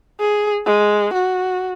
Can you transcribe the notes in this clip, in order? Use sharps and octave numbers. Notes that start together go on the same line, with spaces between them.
G#4
G#3
F#4